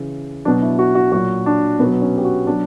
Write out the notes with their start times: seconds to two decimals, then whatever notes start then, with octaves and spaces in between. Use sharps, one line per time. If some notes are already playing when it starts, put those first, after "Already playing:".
Already playing: C#3 E3
0.45 B2 F#3 D4
0.62 E4
0.79 F#4
0.95 F#4
1.12 A#2 F#3 F#4
1.46 D4
1.79 B2 B3
1.83 F#3
2.02 C#4
2.17 G4
2.25 F#4
2.47 B2 F#3 D4